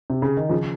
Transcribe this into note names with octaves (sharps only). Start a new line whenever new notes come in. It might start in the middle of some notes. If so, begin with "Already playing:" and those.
C3
C#3
D#3
C#3 F3